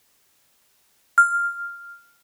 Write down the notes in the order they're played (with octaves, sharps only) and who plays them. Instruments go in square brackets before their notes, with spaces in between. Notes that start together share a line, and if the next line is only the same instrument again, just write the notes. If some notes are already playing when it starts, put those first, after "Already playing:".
[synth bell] F6